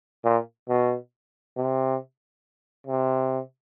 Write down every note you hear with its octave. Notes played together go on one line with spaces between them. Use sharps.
A#2
B2
C3
C3